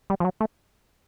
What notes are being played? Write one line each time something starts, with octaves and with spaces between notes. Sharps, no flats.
G3
F3
F#3
A3